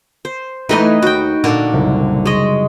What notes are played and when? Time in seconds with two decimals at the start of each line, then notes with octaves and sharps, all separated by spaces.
0.25 C5
0.69 E3 A3 D#4 B4 D#5 G5 G#5
1.02 D#2 D#4 F#4 G5
1.44 A#2 D3 A#4
1.73 F#1 C2
2.26 G#3 D#5 C6 C#6